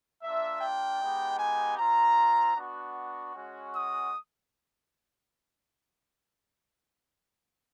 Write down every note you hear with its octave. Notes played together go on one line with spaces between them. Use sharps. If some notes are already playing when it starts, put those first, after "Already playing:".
A#3 D4 F4 E5
G5
G#3 B3 D#4 G4
G#5
C4 F4 A#5
B3 D4 F#4
G#3 C#4 F#4
D#6